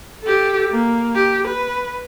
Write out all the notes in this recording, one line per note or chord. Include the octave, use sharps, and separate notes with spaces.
G4 A4
A#3
G4
B4